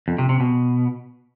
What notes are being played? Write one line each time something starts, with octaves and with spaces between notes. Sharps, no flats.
F2
C3
C3
B2